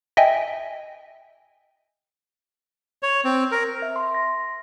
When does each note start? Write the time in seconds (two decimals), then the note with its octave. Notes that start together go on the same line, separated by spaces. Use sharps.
0.17 D#5 E5 G5 G#5
3.03 C#5
3.25 C4
3.52 A#4
3.82 E5
3.96 C6
4.14 A#6